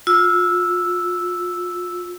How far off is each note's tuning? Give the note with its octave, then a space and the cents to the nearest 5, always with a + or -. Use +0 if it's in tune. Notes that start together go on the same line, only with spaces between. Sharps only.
F4 +30 E6 +0